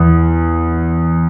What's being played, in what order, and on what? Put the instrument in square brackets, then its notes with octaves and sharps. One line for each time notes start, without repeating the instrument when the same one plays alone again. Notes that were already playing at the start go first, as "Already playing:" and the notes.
Already playing: [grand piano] E2